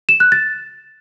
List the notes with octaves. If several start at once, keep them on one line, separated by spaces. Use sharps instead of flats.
E7
F#6
A6